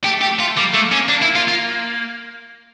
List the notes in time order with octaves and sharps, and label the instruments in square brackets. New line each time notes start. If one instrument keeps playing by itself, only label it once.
[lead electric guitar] A3 [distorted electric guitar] G4
[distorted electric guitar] G4
[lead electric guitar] A3
[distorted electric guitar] F4
[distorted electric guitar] G3 [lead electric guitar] A#3
[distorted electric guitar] A3
C#4
[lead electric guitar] A#3 [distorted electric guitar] D4
[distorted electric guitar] E4
F4
F4